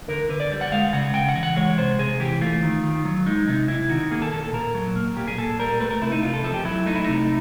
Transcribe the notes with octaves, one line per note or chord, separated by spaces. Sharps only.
D3 A#4
D3 B4
D5
G3
F#5
G#3 F5
C#3 F#5
C#3 G5
F#5
E3
F#5
G#3 C#5
C3 C5
C3 G#4
E3 G4
A3 F4
D#3
D#3
F#3
G#3 D#4
C3 D#4
C3 E4
D#3 F#4
A#3 G#4
A4
A#2 A4
A4
A#2 A#4
F#3
A#3
A#2 G4
G#4
A#2 A4
G3 A#4
A3 B4
A#4
C3 E4
D#4
C3 F4
A4
F3 A4
G4
F#3 E4
A3 D#4
E4
C3 D#4